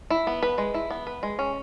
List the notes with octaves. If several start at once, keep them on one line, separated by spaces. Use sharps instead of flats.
E4
B3
B4
G#3
E4
B3
B4
G#3
C#4